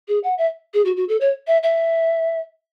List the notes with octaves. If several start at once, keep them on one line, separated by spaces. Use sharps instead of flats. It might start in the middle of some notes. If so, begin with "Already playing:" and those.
G#4
F#5
E5
G#4
F#4
F#4
A4
C#5
E5
E5